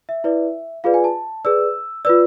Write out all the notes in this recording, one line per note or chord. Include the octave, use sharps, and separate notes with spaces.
E5
E4 B4 D5
F4 G#4 B4 D5 F5
G#5
A5
G#4 B4 D5 E6
F4 B4 D5 E6